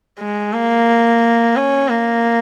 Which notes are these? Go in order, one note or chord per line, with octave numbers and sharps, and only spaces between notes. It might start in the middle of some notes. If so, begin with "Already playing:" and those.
G#3
A#3
C#4
A#3